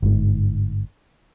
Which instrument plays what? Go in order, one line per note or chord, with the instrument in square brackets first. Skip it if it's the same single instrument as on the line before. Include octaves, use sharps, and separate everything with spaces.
[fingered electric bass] G1 G#2